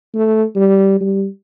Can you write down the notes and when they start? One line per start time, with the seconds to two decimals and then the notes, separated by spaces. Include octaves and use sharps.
0.14 A3
0.56 G3
1.01 G3